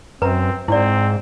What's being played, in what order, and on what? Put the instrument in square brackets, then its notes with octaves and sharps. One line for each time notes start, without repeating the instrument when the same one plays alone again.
[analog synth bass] F#2 [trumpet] C4 [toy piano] B4 A#5
[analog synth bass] G#2 [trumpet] C4 [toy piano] E4 D5